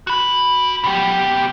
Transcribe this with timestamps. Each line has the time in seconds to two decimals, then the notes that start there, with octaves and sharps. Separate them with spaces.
0.07 F#4 B5
0.84 B2 G4